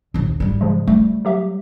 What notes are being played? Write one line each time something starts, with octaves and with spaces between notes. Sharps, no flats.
A#1 D#2
G#2 G3
C#3 F3 G#3
G3 A3
F#3 G4 E5